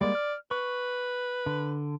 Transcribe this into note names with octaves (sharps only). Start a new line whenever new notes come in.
G3 G#3 A#3 D5
F6
B4 C#6
D3